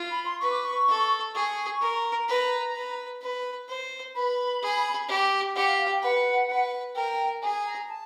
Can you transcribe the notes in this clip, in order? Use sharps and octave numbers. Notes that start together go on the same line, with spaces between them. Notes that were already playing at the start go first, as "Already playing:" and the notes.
Already playing: F4
B5
C6
B4 C#6
D6
C#6
A4
G#4 C#6
A#4
B4 A#5
B4
B4
C5
B4 B5
G#4
G4
G4 F#5
F5
F5
G5
B4 F#5
B4
A#4 G5
G#4 G#5
A#5
A5